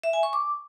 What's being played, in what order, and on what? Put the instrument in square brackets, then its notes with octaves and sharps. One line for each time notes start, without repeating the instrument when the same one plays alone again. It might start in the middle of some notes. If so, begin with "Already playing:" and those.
[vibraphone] E5
G#5
C#6
D6